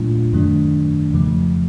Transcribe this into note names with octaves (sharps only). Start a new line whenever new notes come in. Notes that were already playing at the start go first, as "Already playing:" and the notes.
Already playing: A#2 F#3 A3 D4 F4
F#2 D#3 F#3 A3 D4
F2 C#3 F3 A3